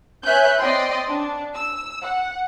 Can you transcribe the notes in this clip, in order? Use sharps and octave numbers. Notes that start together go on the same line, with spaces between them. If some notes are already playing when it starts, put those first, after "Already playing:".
B4 C#5 E5 G#5 F#6 G6
C4 D5 D#5 G5 C6
D4
E6
F#5